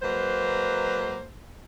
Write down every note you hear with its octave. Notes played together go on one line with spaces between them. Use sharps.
F#3 G#3 A#3 B4 C5